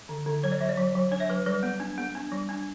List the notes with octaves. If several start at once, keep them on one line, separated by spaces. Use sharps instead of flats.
D3
D3
F#3 C#5
D5
F#3 E5
D5
F#3
F#3
D4 C#5
E5
F#3 B4
G3 B4
B3
D4
B3
D4
G3
D4